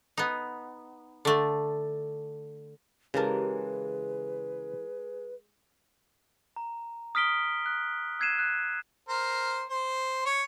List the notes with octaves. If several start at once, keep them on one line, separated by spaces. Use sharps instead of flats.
B3 D#4
D3 A3
C#3 E3 G#3 G4 A#4 B4 A5
A#5
D#6 F6 B6 D7 G7
F#6
E6 F#6 G#6 C7 D#7 E7
F#6
A#4 C5
C5
C#5